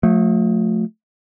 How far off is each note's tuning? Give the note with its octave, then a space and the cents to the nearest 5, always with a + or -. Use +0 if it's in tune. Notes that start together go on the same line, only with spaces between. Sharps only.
F3 +45 A3 +0